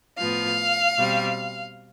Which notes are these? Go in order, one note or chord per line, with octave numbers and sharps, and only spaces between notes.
A2 F3 B3 F5
B2 G3 C4